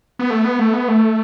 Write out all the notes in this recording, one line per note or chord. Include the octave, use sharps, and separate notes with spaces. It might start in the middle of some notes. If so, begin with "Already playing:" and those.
B3
A3
B3
A3
B3
A3